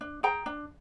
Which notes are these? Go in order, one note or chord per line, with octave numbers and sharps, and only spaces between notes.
D4
G#4 G5 A#5
D4